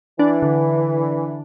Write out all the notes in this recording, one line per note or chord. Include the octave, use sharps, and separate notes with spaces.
E3 D4
D3